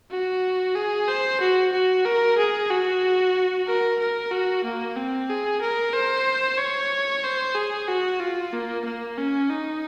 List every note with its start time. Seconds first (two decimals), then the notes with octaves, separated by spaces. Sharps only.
0.11 F#4
0.76 G#4
1.08 C5
1.41 F#4
1.73 F#4
2.05 A#4
2.38 G#4
2.70 F#4
3.67 A#4
3.99 A#4
4.31 F#4
4.64 A#3
4.96 C4
5.29 G#4
5.61 A#4
5.93 C5
6.58 C#5
7.23 C5
7.55 G#4
7.88 F#4
8.20 F4
8.53 A#3
8.84 A#3
9.18 C#4
9.50 D#4